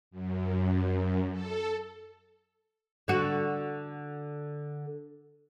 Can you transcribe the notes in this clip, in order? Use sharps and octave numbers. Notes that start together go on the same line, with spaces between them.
F#2
A4
D3 F#4